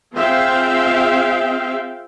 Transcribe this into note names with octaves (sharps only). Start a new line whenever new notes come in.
C4 F4 G#4 E5 F5 G5